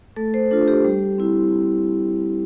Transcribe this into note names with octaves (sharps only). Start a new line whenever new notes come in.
A3 A4
C5
D4 F4 A4
G4
G3
C4 E4